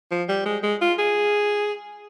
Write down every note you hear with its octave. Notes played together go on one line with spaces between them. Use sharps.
F3
G3
G#3
G#3
F4
G#4